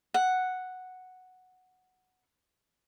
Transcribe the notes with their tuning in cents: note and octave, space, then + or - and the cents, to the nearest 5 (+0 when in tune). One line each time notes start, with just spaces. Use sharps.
F#5 +0